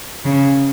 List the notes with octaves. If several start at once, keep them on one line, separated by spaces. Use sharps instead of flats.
C#3